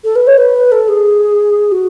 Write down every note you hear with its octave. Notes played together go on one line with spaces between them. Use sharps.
A4
B4
C#5
B4
A4
G#4
F#4